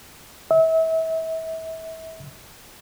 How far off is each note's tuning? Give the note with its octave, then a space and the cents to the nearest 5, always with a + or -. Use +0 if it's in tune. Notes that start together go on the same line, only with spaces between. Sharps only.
E5 -35